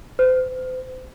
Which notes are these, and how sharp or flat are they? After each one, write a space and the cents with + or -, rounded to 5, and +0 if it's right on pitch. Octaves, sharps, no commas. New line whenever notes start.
C5 -40